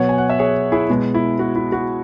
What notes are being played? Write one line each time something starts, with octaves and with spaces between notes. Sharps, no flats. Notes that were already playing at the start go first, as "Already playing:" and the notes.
Already playing: B2 F#3 B3 C#5 F#5
G#5
F#5
E5
G#4 C#5
E4 G#4
B2 G#3 B3
E4
F#4
E4
F#4